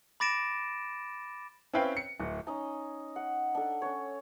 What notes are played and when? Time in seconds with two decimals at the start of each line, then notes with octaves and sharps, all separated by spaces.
0.20 B5 D6 A6 A#6 D7 E7
1.73 C4 C#4 E4 B4 F5 G5
1.97 C#7
2.19 D1
2.47 C#4 D#4 D#5 A#5
3.16 F#5
3.55 D4 A4
3.82 C#4 C#5